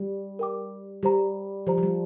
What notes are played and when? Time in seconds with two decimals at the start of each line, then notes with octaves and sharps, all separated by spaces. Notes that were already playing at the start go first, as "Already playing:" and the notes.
Already playing: G3
0.39 A#4 G5 D6
1.03 G3 G4 C5 A#5
1.67 F3 G4 C5 A#5
1.78 F3
1.83 G3